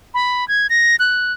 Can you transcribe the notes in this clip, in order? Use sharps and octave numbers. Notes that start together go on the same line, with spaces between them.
B5
G#6
A#6
F#6